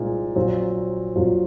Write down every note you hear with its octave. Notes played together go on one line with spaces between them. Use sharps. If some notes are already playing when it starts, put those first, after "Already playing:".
Already playing: C2 A#2 G#3 C4 D#4
A#1 A#2 F#3 C4 F4
A#1 A#2 F#3 C4 F4